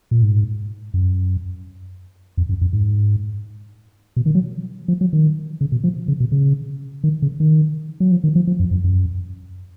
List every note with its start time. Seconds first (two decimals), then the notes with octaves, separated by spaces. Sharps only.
0.11 A#2
0.22 G#2
0.94 F#2
2.37 F2
2.49 F#2
2.61 F#2
2.73 G#2
4.16 B2
4.26 D#3
4.35 F#3
4.88 F3
5.01 F#3
5.13 D#3
5.61 C#3
5.72 B2
5.84 F3
6.08 C#3
6.20 B2
6.32 C#3
7.04 D#3
7.22 C#3
7.40 D#3
8.00 F#3
8.12 F3
8.24 D#3
8.35 F3
8.47 F3
8.60 F#2
8.71 F#2
8.84 F#2